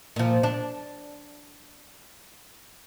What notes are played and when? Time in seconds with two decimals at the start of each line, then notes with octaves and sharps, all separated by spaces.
0.16 A#2 F3
0.43 D4